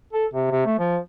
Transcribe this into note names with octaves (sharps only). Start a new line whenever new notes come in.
A4
C3
C3
A3
F3